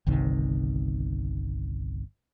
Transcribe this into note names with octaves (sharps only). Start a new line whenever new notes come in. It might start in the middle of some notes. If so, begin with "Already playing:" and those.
G1 C2 C3 D#3